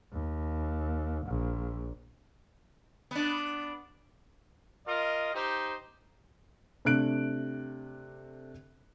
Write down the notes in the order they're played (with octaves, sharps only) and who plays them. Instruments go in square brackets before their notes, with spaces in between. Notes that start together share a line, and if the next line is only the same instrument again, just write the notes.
[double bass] D#2
A#1
[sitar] B3 D4
[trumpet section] F4 A#4 D#5
D#4 G4 C5
[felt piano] C3 A3 D4 F#6 D7